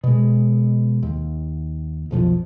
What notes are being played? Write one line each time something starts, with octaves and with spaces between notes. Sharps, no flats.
B2 G#3
D#2
B1 F2 E3 F3